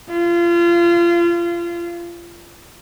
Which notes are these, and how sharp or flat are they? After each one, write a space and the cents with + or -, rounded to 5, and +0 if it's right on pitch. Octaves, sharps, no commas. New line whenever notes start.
F4 -30